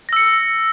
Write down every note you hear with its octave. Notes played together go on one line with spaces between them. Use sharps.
E6 A#6 C#7